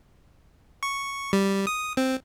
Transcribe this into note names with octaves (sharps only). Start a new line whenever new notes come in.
C#6
G3
D#6
C4